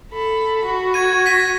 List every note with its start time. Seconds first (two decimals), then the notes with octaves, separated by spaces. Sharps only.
0.11 A4 B5
0.65 F#4
0.94 G#6 D#7
1.26 A#6 B6 D#7